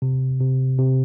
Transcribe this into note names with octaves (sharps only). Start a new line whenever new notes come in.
C3
C3
C3